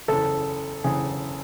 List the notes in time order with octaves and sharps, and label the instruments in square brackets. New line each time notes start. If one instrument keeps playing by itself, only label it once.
[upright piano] F#1 E2 C#3 A4
F#1 E2 C#3 G#4